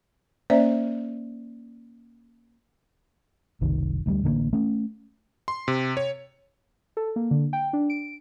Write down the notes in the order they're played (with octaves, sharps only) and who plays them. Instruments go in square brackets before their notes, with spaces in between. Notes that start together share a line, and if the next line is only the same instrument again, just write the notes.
[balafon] A#3 C#4 C5 D5 E5
[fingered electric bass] F#1 C2 D#3
D2 F#3 G3
A1 D3 G#3 A#3
A3 C#4
[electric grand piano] C6
C3
C#5
[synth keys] A4
A#3
D3
G5
D4
D7